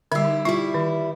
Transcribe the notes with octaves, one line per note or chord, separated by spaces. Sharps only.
D3 G3 E4 G4
D#4
G3 E4 F4
D#3